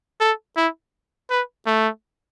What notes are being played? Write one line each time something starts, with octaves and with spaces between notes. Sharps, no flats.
A4
E4
B4
A3